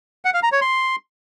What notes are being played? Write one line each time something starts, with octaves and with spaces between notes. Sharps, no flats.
F#5
F5
A#5
C#5
C6